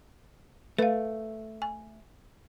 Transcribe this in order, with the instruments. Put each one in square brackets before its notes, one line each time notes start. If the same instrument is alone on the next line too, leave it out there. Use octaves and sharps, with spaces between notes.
[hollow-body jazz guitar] A3 [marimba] B4 F5
[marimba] G#5